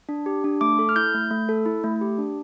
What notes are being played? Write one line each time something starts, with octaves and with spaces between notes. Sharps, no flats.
D4
G4
D4
A3 D6
A4
F6
E4 G6
A3
A3
A4
E4
A3
G4
D4